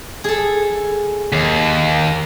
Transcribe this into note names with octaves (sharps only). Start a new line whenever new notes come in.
G#4 A4
D#2